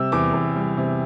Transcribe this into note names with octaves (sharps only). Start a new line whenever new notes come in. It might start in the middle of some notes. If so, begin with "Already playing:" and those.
Already playing: C3 G3 E6
E2 D6
E2
G3
C3